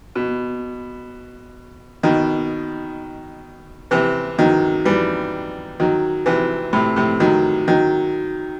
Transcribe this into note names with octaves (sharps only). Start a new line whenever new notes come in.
B2
B2 D#3
C3 E3
D#3 F#3
E3 G3
D#3 F#3
C3 E3
A2 C3
A2 C3
D#3 F#3
D#3 F#3